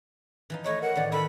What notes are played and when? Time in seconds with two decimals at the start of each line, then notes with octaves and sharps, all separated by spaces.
0.50 E3 F3 D#4
0.64 A3 E4 B4 C#5 D#5
0.82 A#4 F#5
0.95 A2 D#3 E3 D5
1.12 D#3 A4 E5 B5